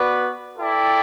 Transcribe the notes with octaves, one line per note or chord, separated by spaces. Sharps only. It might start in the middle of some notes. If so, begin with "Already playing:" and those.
Already playing: B3 F#4 B4 D5
E4 A4 D5 G5